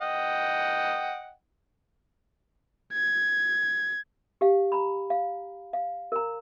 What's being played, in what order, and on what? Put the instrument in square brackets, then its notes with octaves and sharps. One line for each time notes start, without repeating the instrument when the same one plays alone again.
[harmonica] D#5 F#5 G5
[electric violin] G#6
[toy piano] G4 F5
A#5 B5
F5
F5
A#4 A#5